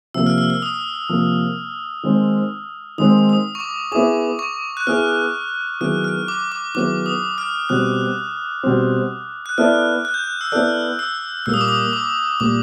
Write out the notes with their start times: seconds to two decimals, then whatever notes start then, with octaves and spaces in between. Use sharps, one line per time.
0.14 C3 F3 A#3 E6
0.26 F6
0.38 E6
0.50 E6
0.62 D#6
1.09 C3 F3 A#3
2.03 D#3 G#3 C4
2.98 D#3 G#3 C4 D#6
3.29 D#6
3.55 C#6
3.60 D6
3.92 B3 E4 G#4 D6
4.39 C#6
4.77 F#6
4.87 B3 E4 G#4 F6
5.80 D#3 F#3 B3 E4 G#4 F6
6.04 F6
6.28 D6
6.52 D6
6.74 D#3 F#3 B3 E4 G#4 D6
7.06 D#6
7.38 F6
7.69 B2 G3 C4 F#6
8.63 B2 G3 C4
9.46 F#6
9.58 B3 E4 A4 D5 F6
10.05 F#6
10.14 G6
10.24 F#6
10.41 E6
10.52 B3 E4 A4 D5 F6
10.99 E6
11.46 A#2 G3 A#3 E6
11.54 D#6
11.61 D6
11.68 D#6
11.93 D6
12.40 A#2 G3 A#3 D6